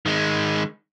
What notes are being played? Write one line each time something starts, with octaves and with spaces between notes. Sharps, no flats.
D#3 G#3